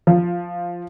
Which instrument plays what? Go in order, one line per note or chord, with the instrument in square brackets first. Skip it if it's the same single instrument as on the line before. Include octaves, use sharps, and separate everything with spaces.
[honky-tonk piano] F3